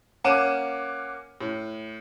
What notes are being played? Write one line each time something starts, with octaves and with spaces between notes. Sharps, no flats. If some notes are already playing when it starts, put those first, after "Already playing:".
A#3 C#4 F#5 D6 D#7 E7
A2